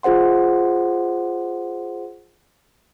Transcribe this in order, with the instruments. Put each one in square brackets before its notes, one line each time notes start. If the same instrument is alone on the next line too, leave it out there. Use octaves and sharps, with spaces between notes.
[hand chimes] F4 G#4 C5 F#5 C6